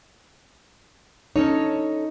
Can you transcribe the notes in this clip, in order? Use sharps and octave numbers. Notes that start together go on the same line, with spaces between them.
C#4 D#4 A4 C#5